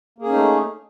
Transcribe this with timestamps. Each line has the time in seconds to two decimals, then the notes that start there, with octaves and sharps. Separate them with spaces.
0.18 A#3
0.22 G#4
0.26 C#4
0.29 D#4
0.33 A3